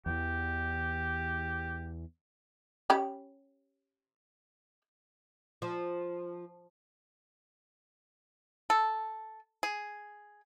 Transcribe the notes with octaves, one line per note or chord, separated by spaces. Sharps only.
E2 E3 G4
C#4 G4 B5
F3
A4
G#4